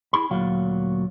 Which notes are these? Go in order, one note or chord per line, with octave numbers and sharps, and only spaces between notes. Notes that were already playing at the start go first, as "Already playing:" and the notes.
E4 G#4 B5
D2 A#2 F#3 F5